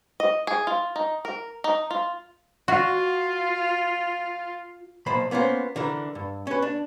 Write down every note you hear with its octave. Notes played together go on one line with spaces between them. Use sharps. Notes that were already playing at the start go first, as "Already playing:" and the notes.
D#5
G#4
F4
D#4
A#4
D#4
F4
F4 F#4
B1 A#2 F3 C5 B5
A#3 B3 C#4 F4 C5
D3 E3 A#4
G2
C#4 B4
D4